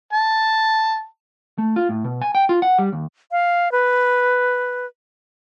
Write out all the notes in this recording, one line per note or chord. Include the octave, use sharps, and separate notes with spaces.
A5
A3
F4
A2
B2
G#5
G5
F4
F#5
G3
D#2
F5
B4